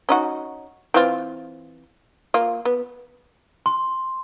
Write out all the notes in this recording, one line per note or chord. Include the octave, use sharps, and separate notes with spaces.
C#4 D#4 F#4
E3 C4 F4
A#3 F4
B3
C6